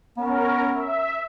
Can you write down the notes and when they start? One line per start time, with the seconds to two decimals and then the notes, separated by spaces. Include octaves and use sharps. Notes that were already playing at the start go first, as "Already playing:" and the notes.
0.17 B3 C#4 A#4
0.73 E5